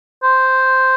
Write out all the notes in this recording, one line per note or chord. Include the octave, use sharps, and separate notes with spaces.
C5